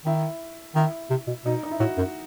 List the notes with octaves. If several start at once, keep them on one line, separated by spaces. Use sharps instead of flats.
D#3 E4
D#3 E4
C3
B2
B2 D#4
D#4
E4
A2 F#4
F#2